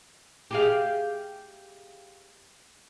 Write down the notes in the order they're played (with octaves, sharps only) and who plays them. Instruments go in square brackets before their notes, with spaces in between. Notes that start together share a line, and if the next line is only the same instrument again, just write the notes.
[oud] G4 G#4 F5